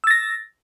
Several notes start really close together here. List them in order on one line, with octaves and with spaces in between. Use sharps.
E6 A6 A#6